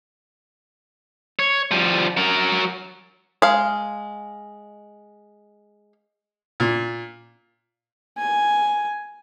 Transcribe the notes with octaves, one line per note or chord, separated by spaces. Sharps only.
C#5
F3 G3
F#3 A#4
G#3 F5
A#2
G#5